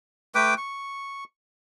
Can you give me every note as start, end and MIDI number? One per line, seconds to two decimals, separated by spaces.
0.35 0.54 57
0.35 0.54 71
0.35 0.54 79
0.35 0.54 86
0.58 1.24 85